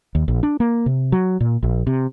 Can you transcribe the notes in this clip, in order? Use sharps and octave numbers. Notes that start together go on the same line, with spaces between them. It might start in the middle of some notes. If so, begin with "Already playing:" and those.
D#2
A#1
D4
A#3
C3
F#3
A#2
A#1
C3